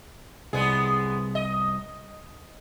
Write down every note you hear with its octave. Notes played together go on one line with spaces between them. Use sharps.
C2 G#3 B3 G#4
D#5